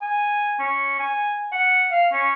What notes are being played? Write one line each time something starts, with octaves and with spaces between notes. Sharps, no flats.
G#5
C#4
G#5
F#5
F5
C#4